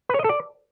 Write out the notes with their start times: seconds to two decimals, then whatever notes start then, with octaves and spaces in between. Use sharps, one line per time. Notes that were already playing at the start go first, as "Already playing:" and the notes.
0.09 B4
0.14 C#5
0.19 D#5
0.24 A4
0.29 D5